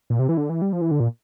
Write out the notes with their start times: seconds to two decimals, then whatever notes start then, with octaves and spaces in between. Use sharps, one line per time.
0.10 A#2
0.19 C3
0.29 E3
0.37 D3
0.50 E3
0.62 G3
0.73 F3
0.81 E3
0.91 D3
1.00 A#2